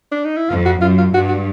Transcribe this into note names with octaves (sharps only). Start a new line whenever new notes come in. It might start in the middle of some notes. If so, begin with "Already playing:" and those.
D4
D#4
E4
F2 F4
F#4
F#2 F4
F4
G2 F#4
F#4